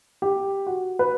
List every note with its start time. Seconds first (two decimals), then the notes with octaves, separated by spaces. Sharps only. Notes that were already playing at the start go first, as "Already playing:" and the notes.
0.22 G4
0.67 F#4
0.99 B4